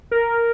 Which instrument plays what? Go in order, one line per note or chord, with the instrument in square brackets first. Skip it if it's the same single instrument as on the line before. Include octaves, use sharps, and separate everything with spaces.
[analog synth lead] A#4